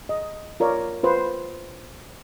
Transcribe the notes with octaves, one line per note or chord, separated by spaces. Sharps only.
D#5
F4 A#4 C#5 D5
F4 B4 C5